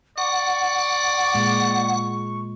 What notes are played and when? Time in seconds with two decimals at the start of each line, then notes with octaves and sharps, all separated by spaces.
0.18 D5 F#5 C#6
1.35 A#2 G#3